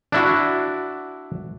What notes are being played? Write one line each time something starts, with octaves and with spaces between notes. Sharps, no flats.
D4 E4 F#4